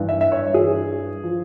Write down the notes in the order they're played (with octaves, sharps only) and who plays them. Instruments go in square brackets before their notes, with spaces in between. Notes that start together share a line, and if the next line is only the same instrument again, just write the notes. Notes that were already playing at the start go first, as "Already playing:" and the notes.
Already playing: [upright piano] G2 E3
E5
E5
C#5
G2 E3 G#4
F3